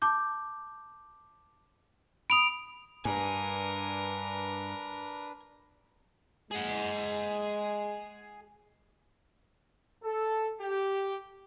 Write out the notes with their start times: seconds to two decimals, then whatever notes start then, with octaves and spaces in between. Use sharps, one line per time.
0.02 A5 D6 G6
2.30 B5 D#6 D7 F7
3.05 G2 D4 A#4 B4 G#5
6.51 G#3 G#4 F#5
10.04 A4
10.61 G4